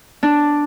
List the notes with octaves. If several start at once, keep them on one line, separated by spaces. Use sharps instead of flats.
D4